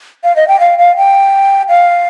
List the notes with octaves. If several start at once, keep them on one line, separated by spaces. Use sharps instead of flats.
F5
D#5
G5
F5
F5
G5
F5